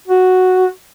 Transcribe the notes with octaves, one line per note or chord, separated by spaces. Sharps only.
F#4